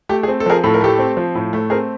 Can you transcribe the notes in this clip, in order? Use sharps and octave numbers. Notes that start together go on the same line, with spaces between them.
A3 G4
G#4
C4
A4
F3 G#4 A#4
A2 A4
A#4
A3 G4 A4
C4
F3
A2
A3
C4 G#4 A#4